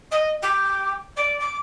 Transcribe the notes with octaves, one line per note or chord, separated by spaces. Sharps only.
D#5
G4
D5
D6